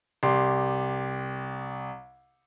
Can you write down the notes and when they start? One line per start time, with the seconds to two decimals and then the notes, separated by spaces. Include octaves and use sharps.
0.23 C2 G4 C6